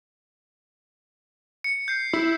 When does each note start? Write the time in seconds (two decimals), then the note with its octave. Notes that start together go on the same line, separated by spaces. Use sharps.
1.64 C#7
1.88 G6 C7
2.13 E4